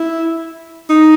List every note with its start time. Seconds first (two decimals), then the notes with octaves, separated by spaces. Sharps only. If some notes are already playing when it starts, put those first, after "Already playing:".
Already playing: E4
0.90 D#4